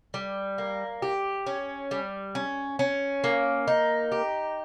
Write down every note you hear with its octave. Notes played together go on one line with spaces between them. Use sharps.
G3
A#3
G4
C#4
G3
C#4
C#4
A#3
D#4
G4